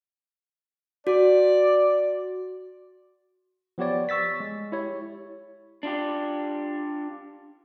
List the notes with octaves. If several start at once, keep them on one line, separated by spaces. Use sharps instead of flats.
F#4 D5
F3 B3 G4 C#5 D5
C#6 E6 A6 B6
G#3
E4 G4 C#5
D4 F4 G4